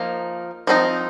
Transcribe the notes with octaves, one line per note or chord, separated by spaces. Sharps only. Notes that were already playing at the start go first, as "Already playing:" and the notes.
Already playing: F3 A#3 D#4
F3 C4 D#4